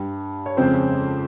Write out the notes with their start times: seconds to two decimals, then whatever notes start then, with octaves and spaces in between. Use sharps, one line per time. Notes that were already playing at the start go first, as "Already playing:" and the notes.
Already playing: G2 G3
0.46 C#5
0.57 F2 C#3 G#3 C4 C5